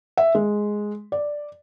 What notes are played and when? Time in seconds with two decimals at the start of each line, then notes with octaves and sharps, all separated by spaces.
0.17 E5
0.35 G#3
1.12 D5